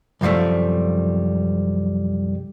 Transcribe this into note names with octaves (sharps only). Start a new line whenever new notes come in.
C2 F#2 F3 G3 A3